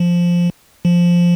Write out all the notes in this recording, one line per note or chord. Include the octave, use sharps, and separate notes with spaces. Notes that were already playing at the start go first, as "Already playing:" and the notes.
Already playing: F3
F3